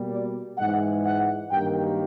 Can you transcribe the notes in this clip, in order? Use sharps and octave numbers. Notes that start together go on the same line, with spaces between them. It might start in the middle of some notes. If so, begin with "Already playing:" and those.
Already playing: B2 G3 A#3
D5
G#2 E3 G#3 F#5
F#5
G2 D#3 F#3 A#3 G5